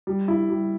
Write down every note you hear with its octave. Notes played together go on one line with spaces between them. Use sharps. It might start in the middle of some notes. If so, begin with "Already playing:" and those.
G3
E4
G3